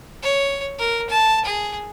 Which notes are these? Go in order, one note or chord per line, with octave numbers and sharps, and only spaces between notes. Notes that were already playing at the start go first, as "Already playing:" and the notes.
C#5
A#4
A5
G#4